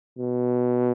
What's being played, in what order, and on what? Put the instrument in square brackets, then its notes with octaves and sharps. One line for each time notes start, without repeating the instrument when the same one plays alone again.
[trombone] B2